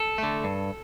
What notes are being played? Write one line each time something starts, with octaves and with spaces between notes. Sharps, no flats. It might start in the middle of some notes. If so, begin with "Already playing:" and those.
Already playing: A4
A3
D3
G2